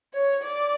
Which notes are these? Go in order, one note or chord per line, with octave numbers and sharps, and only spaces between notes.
C#5
D5